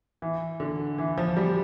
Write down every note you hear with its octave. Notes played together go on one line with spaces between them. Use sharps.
E3
D3
E3
F3
G3